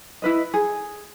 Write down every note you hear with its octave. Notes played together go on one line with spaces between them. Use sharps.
E4 B4 D#5
G#4